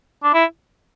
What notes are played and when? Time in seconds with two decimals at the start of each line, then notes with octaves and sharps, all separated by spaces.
0.23 D4
0.34 E4